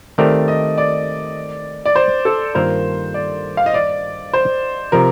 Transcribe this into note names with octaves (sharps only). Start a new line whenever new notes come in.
D#3 A3 C4 G4 A#4 D5
D#5
D5
D5
C5
A4
G2 D#3 A#3 F4 A#4 C5
D5
F5
D#5
D5
C5
C3 F3 A#4